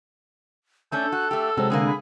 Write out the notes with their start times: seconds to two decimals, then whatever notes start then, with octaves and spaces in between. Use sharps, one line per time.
0.92 A3 C#4 D4 A4 G6
1.12 F#4 F#6
1.31 A3 G4 E6
1.57 C3 F#3 G#3 C4
1.70 A2 D3 A#3 G#4
1.86 B5